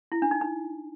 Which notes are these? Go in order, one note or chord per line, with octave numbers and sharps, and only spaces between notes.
E4
D4
D#4
D#4